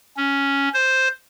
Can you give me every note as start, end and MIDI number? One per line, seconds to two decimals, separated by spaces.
0.17 0.69 61
0.74 1.08 72